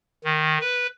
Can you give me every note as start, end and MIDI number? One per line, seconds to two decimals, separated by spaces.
0.24 0.58 51
0.61 0.87 71